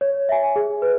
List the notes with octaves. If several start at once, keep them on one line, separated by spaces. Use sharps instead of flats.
C#5
E5 G#5
G#4
B4